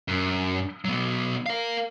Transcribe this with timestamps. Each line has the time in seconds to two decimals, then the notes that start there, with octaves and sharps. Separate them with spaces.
0.08 F#2
0.85 F#3 B3
1.46 A#4 F5